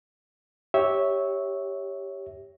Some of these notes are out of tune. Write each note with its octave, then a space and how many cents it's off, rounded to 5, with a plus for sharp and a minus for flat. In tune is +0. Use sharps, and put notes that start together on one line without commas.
G4 +0 C#5 +0 E5 -15